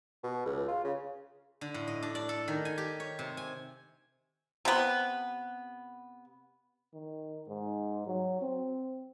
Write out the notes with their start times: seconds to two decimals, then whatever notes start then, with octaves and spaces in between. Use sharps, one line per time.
0.24 B2
0.46 C#2
0.68 F4
0.84 C#3
1.61 D3
1.74 A2
1.87 D#5
2.03 D4
2.15 D5
2.29 A4
2.48 D#3
2.65 G#5
2.78 G4
3.00 C#5
3.19 C3
3.37 G#5
4.65 C3 B3
6.93 D#3
7.48 G#2
8.07 F#3
8.42 C4